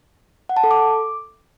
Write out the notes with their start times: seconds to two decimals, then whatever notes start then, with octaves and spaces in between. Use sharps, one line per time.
0.49 F#5
0.57 A5
0.64 A4
0.71 D6